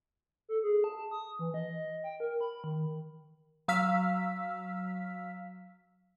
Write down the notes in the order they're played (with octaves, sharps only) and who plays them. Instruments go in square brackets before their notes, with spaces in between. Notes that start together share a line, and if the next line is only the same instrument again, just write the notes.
[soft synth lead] A4
G#4
A5
D#6
E3
D#5
G5
A#4
B5
D#3
[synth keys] F#3 F5 E6 F6 B6